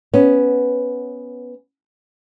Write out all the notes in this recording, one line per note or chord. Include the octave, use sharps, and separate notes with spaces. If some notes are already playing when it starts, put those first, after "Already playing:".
B3 C#4